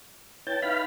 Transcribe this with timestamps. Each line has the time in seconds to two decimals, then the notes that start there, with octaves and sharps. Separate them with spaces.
0.47 E4 B4 C#5 G5 A5
0.62 D#4 B4 E5 F5 B5